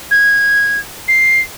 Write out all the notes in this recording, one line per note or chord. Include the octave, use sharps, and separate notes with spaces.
G#6
C7